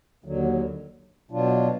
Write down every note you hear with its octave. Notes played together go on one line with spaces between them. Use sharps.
D#2 D3 F#3
B2 F#3 D4 F4